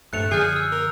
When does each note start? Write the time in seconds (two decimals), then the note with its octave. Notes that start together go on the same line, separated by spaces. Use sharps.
0.13 D1 G2 A3 F#6 C#7 F7
0.31 F#2 D3 F3 G#4 F6 G6 C7
0.56 E6
0.72 A#4